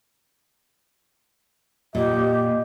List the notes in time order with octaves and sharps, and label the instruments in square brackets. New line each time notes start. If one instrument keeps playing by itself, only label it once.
[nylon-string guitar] A#2 [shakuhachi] G4 [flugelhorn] D#5